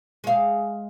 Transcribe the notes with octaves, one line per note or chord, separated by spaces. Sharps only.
G#3 F5